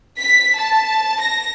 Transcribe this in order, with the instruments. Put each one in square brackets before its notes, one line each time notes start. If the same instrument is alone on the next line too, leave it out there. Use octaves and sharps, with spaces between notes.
[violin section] B6
A5
A#6